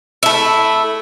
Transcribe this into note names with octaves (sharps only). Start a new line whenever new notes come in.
A3 E4